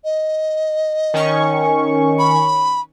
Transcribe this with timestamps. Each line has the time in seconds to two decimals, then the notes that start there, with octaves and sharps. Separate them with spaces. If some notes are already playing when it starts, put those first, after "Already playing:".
0.04 D#5
1.14 D#3 C#4 C#6
2.19 B5